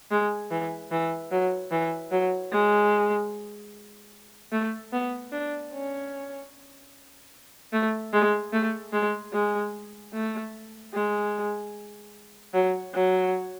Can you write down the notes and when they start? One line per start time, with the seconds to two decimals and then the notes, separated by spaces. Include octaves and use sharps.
0.11 G#3
0.51 E3
0.91 E3
1.31 F#3
1.71 E3
2.11 F#3
2.52 G#3
4.52 A3
4.92 B3
5.32 D4
5.73 C#4
7.73 A3
8.13 G#3
8.53 A3
8.93 G#3
9.34 G#3
10.13 A3
10.94 G#3
12.54 F#3
12.94 F#3